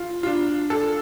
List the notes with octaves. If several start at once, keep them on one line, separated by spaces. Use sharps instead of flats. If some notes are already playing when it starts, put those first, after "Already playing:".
Already playing: F4
F4
D4
A4